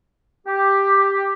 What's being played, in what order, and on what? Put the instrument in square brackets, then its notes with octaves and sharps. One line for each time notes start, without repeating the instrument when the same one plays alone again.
[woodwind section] G4